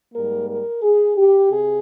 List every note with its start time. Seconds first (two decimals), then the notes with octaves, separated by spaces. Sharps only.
0.13 G#2 G3 A#3 A#4
0.47 A#4
0.82 G#4
1.16 G4
1.51 C3 G#4